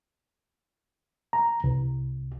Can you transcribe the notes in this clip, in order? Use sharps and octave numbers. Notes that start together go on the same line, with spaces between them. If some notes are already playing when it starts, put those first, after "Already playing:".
A#5
C2